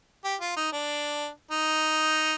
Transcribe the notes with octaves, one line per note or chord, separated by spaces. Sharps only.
G4
F4
D#4
D4
D#4